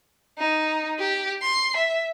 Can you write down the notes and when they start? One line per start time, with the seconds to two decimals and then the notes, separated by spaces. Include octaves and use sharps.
0.38 D#4
0.99 G4
1.42 C6
1.77 E5